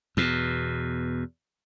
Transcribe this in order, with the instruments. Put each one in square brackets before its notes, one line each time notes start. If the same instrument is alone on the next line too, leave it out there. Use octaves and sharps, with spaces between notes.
[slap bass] E2 B2